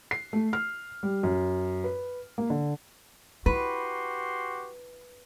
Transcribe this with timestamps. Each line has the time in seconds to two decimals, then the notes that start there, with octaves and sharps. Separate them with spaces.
0.11 C7
0.33 A3
0.53 F6
1.03 G3
1.23 F#2
1.84 B4
2.38 A#3
2.50 D3
3.46 E4 F#4 G4 B4 C6